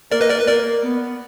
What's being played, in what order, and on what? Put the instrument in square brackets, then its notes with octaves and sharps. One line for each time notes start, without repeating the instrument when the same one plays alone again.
[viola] A#3 [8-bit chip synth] A#4 D5
[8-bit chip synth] B4 D#5
A#4 D5
B4
[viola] A#3 [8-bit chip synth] A#4 D5
[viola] B3